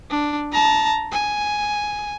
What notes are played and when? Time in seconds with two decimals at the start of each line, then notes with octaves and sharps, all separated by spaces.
0.10 D4
0.52 A5 A#5
1.12 G#5